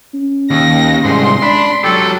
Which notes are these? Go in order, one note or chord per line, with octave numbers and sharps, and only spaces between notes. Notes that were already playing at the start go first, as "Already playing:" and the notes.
C#4
D#2 A#6
C2 G#2 C6
D4 B5
F#3 G4 A4